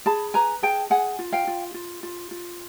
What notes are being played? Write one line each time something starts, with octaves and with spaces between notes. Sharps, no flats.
G#4 A5 B5
B4 G#5 A#5
G#4 G5 A5
G#4 F#5 G#5
F4
F5 G5
F4
F4
F4
F4